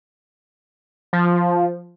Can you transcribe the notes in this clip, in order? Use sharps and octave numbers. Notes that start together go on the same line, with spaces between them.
F3